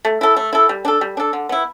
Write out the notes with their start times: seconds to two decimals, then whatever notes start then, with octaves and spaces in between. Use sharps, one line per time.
0.05 A3
0.21 E4 A4
0.37 A3
0.53 E4 A4
0.69 G3
0.85 D4 A4
1.01 G3
1.17 D4 A4
1.33 D3
1.49 B3 E4